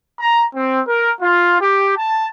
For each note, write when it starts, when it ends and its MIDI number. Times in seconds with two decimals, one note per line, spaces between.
0.20 0.45 82
0.55 0.81 60
0.86 1.13 70
1.21 1.61 65
1.61 1.96 67
1.98 2.27 81